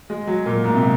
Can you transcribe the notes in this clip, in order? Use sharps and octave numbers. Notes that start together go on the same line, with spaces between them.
G#3
F#3
A#2
G#2
C3